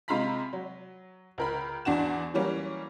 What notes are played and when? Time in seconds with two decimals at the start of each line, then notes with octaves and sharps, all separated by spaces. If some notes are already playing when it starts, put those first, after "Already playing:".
0.08 C3 G#3 F4 A#5 B5 B6
0.53 F#3
1.38 C#2 A#4 B5
1.85 E2 D4 F#4 E7
2.34 E3 F#3 G3 A#3 C#4